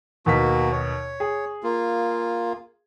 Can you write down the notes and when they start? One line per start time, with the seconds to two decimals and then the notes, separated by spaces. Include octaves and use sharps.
0.26 D#2 B2 A#3 F#4 B6
0.72 C#5
1.20 G#4
1.63 A#3 F4